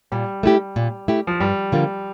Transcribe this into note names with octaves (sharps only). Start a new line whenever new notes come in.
A#2 G3
A3 E4 G4
A#2
A3 E4 G4
F3
G2 G3
D3 F3 A#3 F4